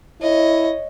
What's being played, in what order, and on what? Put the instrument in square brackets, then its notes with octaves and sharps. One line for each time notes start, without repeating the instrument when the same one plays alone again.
[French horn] E4 [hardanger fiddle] C#5 D#5